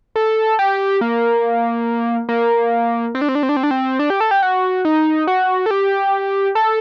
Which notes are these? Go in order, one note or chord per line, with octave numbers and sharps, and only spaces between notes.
A4
G4
A#3
A#3
C4
D4
C4
D4
C4
D4
C4
D4
C4
D4
G4
A4
G4
F#4
D#4
F#4
A4
G4
A4